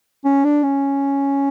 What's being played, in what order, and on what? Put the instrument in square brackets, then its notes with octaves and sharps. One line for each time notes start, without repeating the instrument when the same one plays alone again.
[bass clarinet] C#4
D4
C#4